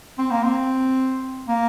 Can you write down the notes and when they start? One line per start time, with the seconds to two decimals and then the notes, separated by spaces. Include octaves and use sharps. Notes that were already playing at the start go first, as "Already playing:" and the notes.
0.19 C4
0.31 A#3
0.43 C4
1.49 A#3